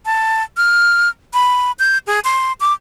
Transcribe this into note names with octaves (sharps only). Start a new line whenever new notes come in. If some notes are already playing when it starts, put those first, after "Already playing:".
A5
F6
B5
G6
G#4
C6
D6